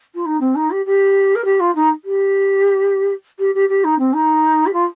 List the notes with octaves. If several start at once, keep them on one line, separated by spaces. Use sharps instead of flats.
F4
D#4
C4
D#4
G4
G4
A#4
G4
F4
D#4
G4
G4
G4
G4
D#4
C4
D#4
G4
F4